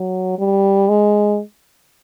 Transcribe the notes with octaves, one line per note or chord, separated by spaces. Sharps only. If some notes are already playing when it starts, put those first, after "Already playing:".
Already playing: F#3
G3
G#3